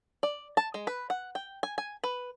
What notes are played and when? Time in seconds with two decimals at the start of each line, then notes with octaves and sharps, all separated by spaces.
0.23 D5
0.57 A5
0.74 G#3
0.87 B4
1.10 F#5
1.35 G5
1.63 G#5
1.78 G#5
2.04 B4